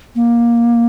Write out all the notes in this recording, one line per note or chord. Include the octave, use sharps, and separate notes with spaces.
A#3